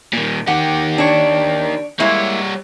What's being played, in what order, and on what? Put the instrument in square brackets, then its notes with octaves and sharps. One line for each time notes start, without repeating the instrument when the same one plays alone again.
[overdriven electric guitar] A#2 D#3
[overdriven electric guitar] D#3 G4 [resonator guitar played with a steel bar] F#5
[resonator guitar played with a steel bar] D4 C#5
[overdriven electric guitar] G3 C#5 [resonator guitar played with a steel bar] G#3 A#3 E4